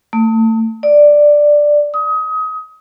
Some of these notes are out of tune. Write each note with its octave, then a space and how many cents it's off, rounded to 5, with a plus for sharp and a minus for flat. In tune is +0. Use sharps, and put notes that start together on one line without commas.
A3 +30
D5 +5
D#6 +25